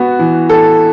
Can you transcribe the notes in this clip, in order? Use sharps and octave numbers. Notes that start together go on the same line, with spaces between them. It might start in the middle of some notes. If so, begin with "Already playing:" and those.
Already playing: B3 F#4
E3
A4